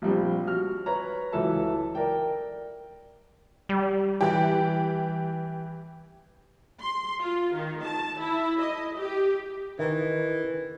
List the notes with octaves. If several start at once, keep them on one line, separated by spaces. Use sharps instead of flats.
A#1 G3 C4
F#4 F6
B4 C#5 A#5
C#2 E3 F#3 A4 E5 A5
A#4 D5 G5
G3
E3 G4
C6
F4
D#3
A5
E4
D#5
G4
D#3 E3